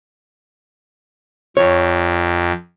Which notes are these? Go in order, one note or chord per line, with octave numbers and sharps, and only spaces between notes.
F2 C#5